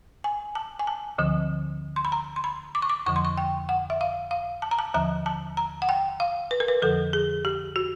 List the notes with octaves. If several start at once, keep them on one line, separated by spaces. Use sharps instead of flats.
G#5
A5
G#5
A5
D2 D3 F3
C6
B5
A#5
C6
B5
D6
C#6
D6
F2 D3 F3 C#6
C6
C#6
G5
F#5
E5
F5
F5
A5
A#5
A5
D#2 D3 F3 A#5
A5
A#5
F#5
G5
F5
B4
A#4
B4
F2 D3 F3 A4
G#4
G4
F#4